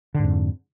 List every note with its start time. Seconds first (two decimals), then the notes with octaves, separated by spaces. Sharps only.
0.14 D3
0.19 G#2
0.24 F2